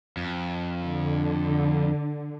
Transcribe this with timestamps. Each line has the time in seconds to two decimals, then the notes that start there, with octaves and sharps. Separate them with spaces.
0.17 F2
0.82 D3